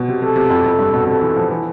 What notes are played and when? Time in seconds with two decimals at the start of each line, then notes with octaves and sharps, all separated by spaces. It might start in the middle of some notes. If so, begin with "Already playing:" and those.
Already playing: B2
0.08 C3
0.22 C3 A4
0.36 C3
0.50 F2
0.65 F2
0.79 G2
0.94 B2
1.07 C3 A4
1.21 E3
1.36 F3
1.50 E3